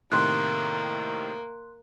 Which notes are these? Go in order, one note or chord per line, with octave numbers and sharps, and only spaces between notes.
A2 C3 D#3 A#3 C6 F#6